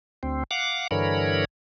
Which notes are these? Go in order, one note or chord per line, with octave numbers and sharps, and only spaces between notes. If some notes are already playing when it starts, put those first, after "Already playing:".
D2 C4
F5 F#5 D6
G2 D3 E3 A#4 C#5 B5